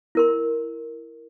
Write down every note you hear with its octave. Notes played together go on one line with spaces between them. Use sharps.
E4 A#4 C6